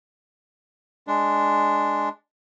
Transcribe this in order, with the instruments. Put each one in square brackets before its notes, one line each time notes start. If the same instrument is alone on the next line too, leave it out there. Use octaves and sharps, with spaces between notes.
[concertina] G#3 D4